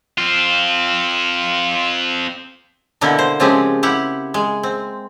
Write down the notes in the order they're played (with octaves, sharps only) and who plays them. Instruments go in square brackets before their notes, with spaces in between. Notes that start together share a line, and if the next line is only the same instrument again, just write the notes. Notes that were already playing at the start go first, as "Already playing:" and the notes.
[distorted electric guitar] C4 F4
[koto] B2 D3 A#3 E4
C5
C#3 F3 G#3 C4 C#4 G4
E4 G4 F#5
G#3
C4